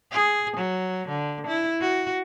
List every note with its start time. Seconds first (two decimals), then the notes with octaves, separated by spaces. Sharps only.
0.12 G#4
0.57 F#3
1.08 D3
1.47 E4
1.81 F#4